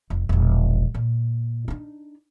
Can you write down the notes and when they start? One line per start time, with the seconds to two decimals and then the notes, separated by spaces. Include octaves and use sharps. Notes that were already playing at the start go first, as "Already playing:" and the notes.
0.10 F1
0.29 E1 A#1
0.94 A#2
1.68 D4 D#4